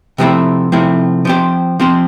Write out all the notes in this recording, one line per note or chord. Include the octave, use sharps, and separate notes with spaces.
C3 F3 A3 C4 E4
C3 F3 A3 C4 E4
F3 C4 G4 C5
F3 C4 G4 C5